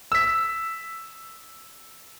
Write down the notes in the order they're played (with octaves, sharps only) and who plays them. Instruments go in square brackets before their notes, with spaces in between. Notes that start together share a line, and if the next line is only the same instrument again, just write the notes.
[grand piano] E6 B6